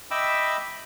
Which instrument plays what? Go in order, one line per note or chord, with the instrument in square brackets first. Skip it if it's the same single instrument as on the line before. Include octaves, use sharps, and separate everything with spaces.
[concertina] D#5 E5 G5 B5 D6 E6